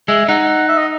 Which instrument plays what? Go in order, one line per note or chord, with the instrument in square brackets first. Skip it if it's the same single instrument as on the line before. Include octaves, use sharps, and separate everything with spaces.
[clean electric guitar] G#3 [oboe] E5
[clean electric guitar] D#4 [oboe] F#5
[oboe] E5
D#5